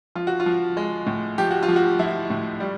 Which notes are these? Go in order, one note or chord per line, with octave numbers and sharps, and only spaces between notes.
F3 F4
F#4
F4
F3
G#3
A2
F3 G4
F#4
F4
F3
F#4
F3 E4
A2
G3